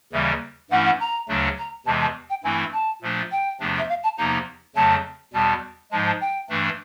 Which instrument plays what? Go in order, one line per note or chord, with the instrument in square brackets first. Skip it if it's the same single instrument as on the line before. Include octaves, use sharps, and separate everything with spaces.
[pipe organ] D#2 C#3 E3 G3 [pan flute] E5
[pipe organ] G2 E3 A3 C#4 E4 [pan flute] F#5
[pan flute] F#5
A#5
[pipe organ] D2 C#3 F#3 A3 D4
[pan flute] A#5
[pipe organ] E2 C3 E3 G#3 [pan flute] A5
[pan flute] A5
G5
[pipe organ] G2 E3 A3 C4 E4 [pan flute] G#5
[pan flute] A5
[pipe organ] A#2 F3 A3 D4
[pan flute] G5
[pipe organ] E2 C3 F3 A3 D4
[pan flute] E5
F5
A5
[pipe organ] E2 C3 F3 A#3 D#4 [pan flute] A#5
[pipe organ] F2 C#3 F#3 A3 [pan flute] A5
[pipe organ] E2 B2 G3 [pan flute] A5
[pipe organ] G#2 F3 G#3 [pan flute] A5
[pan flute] A5
G5
[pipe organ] G2 E3 A3 D4